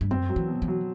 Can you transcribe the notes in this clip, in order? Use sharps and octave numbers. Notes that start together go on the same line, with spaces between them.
G2
F#2 C4
F#3
E3
B2
E3
F#3